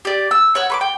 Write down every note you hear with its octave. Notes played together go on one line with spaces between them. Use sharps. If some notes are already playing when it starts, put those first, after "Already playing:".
G4 D5
E6
C#5 F#5 E6
B4 C#6 D6
G5